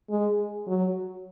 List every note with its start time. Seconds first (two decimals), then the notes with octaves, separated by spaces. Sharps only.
0.10 G#3
0.67 F#3